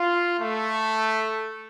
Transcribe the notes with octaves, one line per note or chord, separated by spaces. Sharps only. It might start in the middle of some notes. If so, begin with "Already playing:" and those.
Already playing: F4
A3